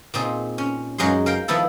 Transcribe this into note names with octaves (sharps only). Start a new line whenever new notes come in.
A#2 C4 D#4 G#4
C#4
F#2 F#3 G#3 D#4 C6
A#4 F5 G5
D#3 F3 B3 E4 A4